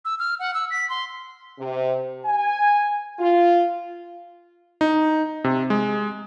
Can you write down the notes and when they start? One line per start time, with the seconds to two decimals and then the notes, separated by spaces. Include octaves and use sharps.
0.05 E6
0.19 F6
0.40 F#5
0.54 E6
0.71 B6
0.90 C6
1.58 C3
2.24 G#5
3.19 F4
4.81 D#4
5.44 C3
5.70 G#3